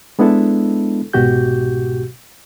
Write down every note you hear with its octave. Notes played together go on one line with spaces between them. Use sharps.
G#3 B3 D4 E4 A4
C2 G#2 B2 F#4 G4 G6